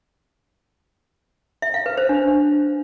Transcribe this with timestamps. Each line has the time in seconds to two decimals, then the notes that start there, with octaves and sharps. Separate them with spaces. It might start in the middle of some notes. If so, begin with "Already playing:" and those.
1.62 E5
1.74 F5
1.86 B4
1.97 C5
2.09 D4